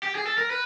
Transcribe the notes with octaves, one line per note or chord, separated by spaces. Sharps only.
G4
G#4
A4
A#4
B4